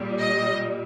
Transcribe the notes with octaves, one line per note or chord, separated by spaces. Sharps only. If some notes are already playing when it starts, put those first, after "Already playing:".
Already playing: A#2 G3
D#5